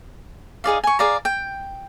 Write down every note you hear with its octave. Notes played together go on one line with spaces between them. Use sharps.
D#4 G#4 D5 F5
G#5 C#6
G#4 D5 F5 A#5
G5